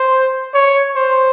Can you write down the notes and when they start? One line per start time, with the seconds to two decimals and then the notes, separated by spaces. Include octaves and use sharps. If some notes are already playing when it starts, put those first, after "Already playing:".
Already playing: C5
0.54 C#5
0.96 C5